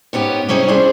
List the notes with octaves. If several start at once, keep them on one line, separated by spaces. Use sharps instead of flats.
G#2 B3 C#4 G4
C3 G3 C#4 E4 G#4 D#5
D4 E4 G#4 C5